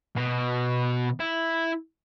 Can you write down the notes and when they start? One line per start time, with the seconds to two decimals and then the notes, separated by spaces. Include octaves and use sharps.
0.16 B2
1.20 E4